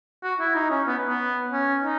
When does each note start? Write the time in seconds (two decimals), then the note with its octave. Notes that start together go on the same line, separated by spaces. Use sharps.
0.24 F#4
0.39 E4
0.55 D#4
0.71 C#4
0.87 B3
1.06 B3
1.52 C#4
1.84 D#4